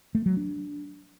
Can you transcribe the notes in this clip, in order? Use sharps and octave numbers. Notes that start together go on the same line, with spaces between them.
A3
F#3
D4